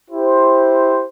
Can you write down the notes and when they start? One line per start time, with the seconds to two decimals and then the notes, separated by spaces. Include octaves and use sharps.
0.10 E4 G4 C5